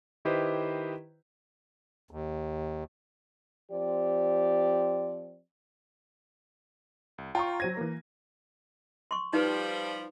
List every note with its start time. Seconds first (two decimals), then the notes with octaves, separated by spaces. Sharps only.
0.25 D#3 E4 G4 B4 C5 D#5
2.11 D#2
3.71 F3 C4 G4 D5
7.18 C2
7.35 F4 G5 A#5 C#6
7.60 F#3 C5 G#6 A#6 D#7
7.77 E3 A#3
9.11 C6 C#6
9.33 F3 G3 D#4 B4